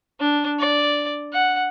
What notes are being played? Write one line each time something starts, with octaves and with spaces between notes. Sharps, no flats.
D4
D5
F#5